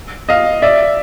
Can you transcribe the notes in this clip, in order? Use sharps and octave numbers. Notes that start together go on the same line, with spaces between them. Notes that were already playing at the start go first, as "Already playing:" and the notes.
D#5 F5
D5 E5